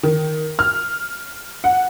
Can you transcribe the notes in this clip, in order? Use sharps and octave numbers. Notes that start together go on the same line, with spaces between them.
D#3
F6
F#5